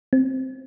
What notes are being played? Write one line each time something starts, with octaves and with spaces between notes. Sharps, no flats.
C4